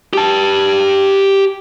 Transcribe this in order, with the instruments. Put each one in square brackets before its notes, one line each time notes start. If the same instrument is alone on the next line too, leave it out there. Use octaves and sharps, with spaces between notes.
[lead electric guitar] G4 A5